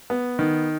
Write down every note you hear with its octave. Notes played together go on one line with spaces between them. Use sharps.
B3
D#3